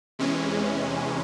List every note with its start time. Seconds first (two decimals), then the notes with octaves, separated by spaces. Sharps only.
0.19 E2 C3 E3 G#3 C#4